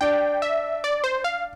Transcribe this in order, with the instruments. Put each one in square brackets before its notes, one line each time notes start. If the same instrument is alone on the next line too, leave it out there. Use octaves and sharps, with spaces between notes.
[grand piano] D4 [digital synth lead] G5
[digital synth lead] E5
D5
C5
F5